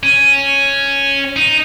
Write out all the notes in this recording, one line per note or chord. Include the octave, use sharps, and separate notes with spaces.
C#4
D#4